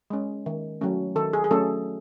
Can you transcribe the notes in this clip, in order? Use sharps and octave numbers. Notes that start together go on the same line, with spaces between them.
G#3 C#4
D#3
F#3 A3 C#4
D#3 A4
G#4
G#4
F#3 A3 C#4 A4